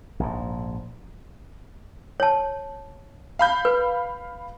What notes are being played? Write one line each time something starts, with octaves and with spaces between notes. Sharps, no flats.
A#1 G#2
C#5 A5
F5 B5 G6
B4